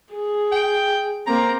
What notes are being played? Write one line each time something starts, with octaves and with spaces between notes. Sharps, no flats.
G#4
G5
A#3 C4 A#5